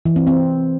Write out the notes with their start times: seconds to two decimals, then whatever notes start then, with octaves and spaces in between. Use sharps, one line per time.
0.05 E3
0.16 C4
0.27 C4